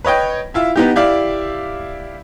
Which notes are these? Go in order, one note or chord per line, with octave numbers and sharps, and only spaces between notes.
B4 C#5 D#5 G5
E4 F4 E5
B3 D#4 G4
E4 G4 D5 E5 F5